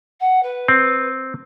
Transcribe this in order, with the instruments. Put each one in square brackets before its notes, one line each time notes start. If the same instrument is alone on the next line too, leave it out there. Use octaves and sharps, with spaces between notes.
[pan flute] F#5
B4
[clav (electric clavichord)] C4